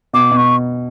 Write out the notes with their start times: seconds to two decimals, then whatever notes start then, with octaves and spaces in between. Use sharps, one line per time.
0.13 B2 D6
0.31 B2
0.37 C#6